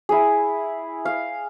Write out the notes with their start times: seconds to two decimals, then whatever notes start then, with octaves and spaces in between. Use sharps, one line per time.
0.09 E4 G#4
1.05 F5